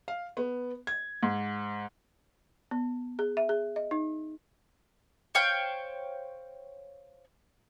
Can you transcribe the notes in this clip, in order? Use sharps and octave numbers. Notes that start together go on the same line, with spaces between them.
F5
B3
G#6
G#2
B3
G#4
E5
G#4
D#5
D#4
C5 C#5 F5 G5